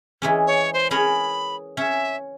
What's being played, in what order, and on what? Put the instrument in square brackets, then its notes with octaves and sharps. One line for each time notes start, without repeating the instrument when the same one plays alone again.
[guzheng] E3 G#3 C#4
[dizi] C#5
C5
[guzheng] C#4 G#4 A#4 [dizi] B5
[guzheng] C#4 [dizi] E5